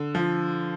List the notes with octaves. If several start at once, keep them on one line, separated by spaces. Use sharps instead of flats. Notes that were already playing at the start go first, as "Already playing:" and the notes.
Already playing: D3
F3